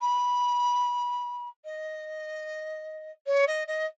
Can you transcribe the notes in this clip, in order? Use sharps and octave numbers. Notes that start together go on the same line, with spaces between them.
B5
D#5
C#5
D#5
D#5